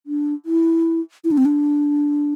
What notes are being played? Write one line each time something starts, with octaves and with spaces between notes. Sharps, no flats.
D4
E4
E4
D4
C4
D4